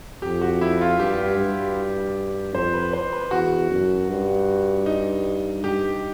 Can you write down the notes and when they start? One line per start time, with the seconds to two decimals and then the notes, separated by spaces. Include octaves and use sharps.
0.22 F2 G4
0.41 F#4
0.61 E4
0.81 F4
0.99 G2 G4
1.38 G2
2.54 F2 C5
2.74 B4
2.93 C5
3.13 B4
3.31 E2 F#4
3.70 F#2
4.09 G2
4.86 D#4
5.63 G2 G4